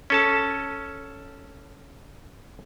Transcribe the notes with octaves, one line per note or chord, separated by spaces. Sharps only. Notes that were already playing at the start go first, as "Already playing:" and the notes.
C#4 A4 A5